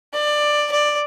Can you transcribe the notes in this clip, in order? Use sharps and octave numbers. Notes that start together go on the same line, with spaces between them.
D5
D5